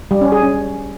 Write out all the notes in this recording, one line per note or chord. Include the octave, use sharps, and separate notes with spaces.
G3
C#4
G#4
C#4